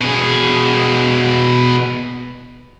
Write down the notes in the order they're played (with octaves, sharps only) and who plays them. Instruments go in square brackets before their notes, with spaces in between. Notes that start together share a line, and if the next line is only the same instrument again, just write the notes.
[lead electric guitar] B2 G#4